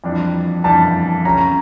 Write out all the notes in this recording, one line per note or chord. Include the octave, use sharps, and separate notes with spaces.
F2 E3 G3 D4
F2 E3 G3 D4 A5
C#3 G3 C#4 A#5